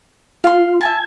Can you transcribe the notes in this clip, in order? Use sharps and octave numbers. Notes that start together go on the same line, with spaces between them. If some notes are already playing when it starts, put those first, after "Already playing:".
F4 F5 C6
E5 G#5 A5 G#6